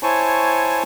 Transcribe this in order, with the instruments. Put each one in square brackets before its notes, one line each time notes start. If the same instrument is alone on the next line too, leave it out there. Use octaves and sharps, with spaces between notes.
[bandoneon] E4 C5 C#5 G#5 A5 C#6